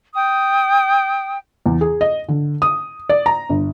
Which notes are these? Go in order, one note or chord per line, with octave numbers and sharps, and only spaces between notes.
G5 D#6
E2
G#4
D#5
D3
D#6
D5
A#5
G1